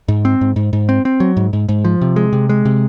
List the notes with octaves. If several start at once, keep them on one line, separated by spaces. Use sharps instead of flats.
G#2
C4
G#2
G#2
G#2
C4
C4
F#3
G#2
G#2
G#2
F3
C3
G#3
C3
G#3
C3